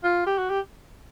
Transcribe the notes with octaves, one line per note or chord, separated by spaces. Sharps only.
F4
G4
F#4
G4